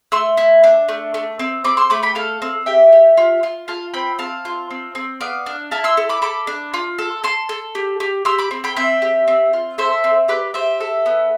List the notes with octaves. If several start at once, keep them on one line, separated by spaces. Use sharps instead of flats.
A3 C6 E6
E4
D4
A3
A3
C4
C4 B5 D6
C6 E6
A3 B5 D6
G5 B5
A4 F5 A5
C4
G4 E5 G5
G4
F4
F4
F4 F5 A5
C4 G5 B5
C4 F5 A5
F4
C4
C4
B3 D5 F5
D4
E4 F5 A5
C6 E6
A4
B5 D6
A4 B5 D6
D4
F4
A4
A4 A5 C6
A4
G4
G4
G4 C6 E6
B5 D6
C4
G5 B5
C4 E5 G5
G4
C4
F4
A4 C5 E5
C4
G4 B4 D5
G4 C5 E5
A4
B3